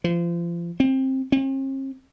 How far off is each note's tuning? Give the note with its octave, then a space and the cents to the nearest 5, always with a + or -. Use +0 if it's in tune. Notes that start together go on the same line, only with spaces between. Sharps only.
F3 -35
C4 +20
C4 +45